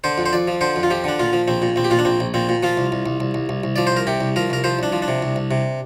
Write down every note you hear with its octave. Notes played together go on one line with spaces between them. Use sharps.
D3 C5
F2
C5
F2 D5
F3
D3 C5
F2
F4
F3 G4
D3 D4
A#2 F4
F3
A#1 C4
A#2
A#1 C4
G4
A#2 F4
D4
A#1 C4
A#1
A#2 C4
A#2
F3 F4
C2
C2
C2
C2
C2
C2
C2
F3 D5
C5
C2 A#4
C3 G4
C2
F3 A#4
C2 A#4
F3 C5
C2 D4
F3
D4
C3
C2
C2
C3